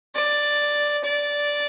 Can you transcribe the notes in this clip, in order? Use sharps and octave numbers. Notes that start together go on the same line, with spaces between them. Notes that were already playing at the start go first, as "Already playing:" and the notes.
D5
D5